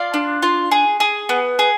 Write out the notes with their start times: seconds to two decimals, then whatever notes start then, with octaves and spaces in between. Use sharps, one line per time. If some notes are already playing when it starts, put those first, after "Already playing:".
Already playing: F4 D5 F5
0.14 D4
0.42 F4
0.71 G#4
1.00 G#4
1.29 B3
1.59 G#4